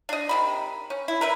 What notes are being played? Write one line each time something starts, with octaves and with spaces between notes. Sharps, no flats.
D4 D#5
C3 D#3 B5
C#4
E4
A#4 B4 E5